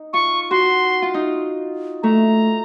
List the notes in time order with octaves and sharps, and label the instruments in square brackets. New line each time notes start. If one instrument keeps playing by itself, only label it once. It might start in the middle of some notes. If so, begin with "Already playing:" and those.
Already playing: [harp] D#4
[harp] F4 [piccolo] C#6
[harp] F#4 [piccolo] C6
[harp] F4
D#4
[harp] A3 [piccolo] A#5